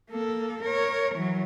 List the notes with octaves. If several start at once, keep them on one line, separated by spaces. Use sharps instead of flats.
A#3 A4
A#4 C#5
E3 F#3